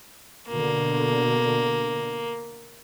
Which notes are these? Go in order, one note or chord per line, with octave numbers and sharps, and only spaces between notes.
B2 D3 A#3